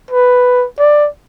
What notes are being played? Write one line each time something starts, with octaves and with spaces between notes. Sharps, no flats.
B4
D5